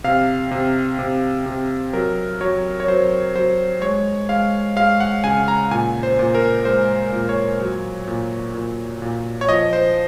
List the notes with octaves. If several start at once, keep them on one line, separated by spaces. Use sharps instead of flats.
C3 F5
C3
C3
C3
F#3 A#4
F#3 C#5
C#5
F#3 C5
F#3 C5
G#3 C#5
G#3 F5
G#3 F5
F#5
C#3 G#5
A#5
A#2 G#5
C5
A#2
A#4
G#3 C5
A#2
C#5
F#3
A#2
A#2
A#2
C#5
F3 D#5
C5